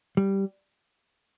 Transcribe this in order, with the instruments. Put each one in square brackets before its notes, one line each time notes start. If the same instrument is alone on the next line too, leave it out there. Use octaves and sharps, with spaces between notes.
[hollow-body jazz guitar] G3